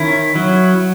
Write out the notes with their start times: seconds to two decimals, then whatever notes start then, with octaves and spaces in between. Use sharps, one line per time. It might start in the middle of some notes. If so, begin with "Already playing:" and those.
Already playing: D#3 C#4 E4
0.36 F#3